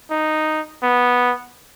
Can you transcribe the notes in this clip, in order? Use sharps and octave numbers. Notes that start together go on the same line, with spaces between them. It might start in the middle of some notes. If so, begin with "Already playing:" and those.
D#4
B3